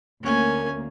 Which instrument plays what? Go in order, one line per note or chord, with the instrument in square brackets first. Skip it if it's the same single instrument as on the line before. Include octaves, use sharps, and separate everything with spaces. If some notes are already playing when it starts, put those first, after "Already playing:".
[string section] D2 A#3 [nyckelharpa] C#4 G#5